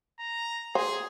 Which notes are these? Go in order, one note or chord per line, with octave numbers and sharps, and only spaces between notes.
A#5
G#4 C5